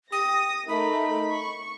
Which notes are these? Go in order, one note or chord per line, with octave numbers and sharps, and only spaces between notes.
G4 D#6 A#6
A3 D#4 A#4 B5
C#6